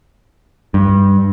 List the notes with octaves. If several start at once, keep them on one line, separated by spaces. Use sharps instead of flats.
G2